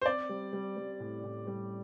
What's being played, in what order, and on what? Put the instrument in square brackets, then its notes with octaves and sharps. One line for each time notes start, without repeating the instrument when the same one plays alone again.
[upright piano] C5
[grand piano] C4 [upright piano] D5
[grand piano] G3
G3
G3
A2
A2
G3